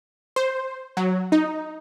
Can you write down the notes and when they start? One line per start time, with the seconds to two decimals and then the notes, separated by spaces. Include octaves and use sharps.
0.36 C5
0.97 F#3
1.32 D#4